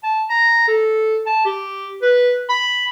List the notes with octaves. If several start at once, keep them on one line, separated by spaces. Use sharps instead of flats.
A5
A#5
A4
A5
G4
B4
B5